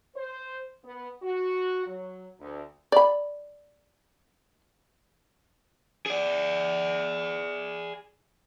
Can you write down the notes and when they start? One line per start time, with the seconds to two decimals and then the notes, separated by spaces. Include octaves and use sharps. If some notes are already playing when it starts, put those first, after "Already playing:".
0.16 C5
0.84 B3
1.23 F#4
1.87 F#3
2.40 D2
2.92 D5 B5
6.06 G#4 D5